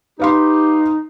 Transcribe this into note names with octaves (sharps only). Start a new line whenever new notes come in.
D#4 G4 B4 F5 C6